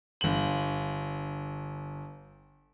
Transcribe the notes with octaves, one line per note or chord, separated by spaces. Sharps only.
G1 F#7